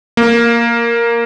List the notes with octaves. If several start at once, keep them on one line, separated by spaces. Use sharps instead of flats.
A#3